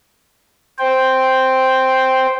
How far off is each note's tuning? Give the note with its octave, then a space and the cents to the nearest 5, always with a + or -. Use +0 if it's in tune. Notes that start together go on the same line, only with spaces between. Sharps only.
C5 +0 G5 +0